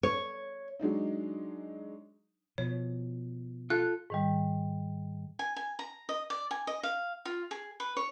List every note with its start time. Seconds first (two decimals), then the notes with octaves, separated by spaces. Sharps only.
0.03 C#5
0.79 F#3 G#3 D4 D#4
2.58 B2 F3 C#5
3.70 F4 A4 F#6
4.10 G#2 D#3 G3
5.39 G#5
5.56 G#5
5.79 A#5
6.09 D#5
6.30 D5
6.51 G#5
6.67 D#5
6.83 F5
7.25 F4
7.51 G#4
7.80 B4
7.97 C#5